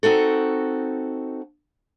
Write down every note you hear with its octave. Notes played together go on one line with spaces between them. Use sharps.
C4 D#4 F#4 A4